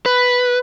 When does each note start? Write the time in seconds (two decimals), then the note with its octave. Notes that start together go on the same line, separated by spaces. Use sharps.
0.06 B4